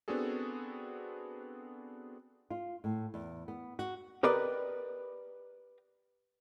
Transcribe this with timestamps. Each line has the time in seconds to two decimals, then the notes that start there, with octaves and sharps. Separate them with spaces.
0.08 B3 C4 D4 F#4 G#4 A4
2.50 F4
2.84 A2
3.14 E2
3.48 B3
3.79 F#4
4.23 G4 A#4 B4 D5 D#5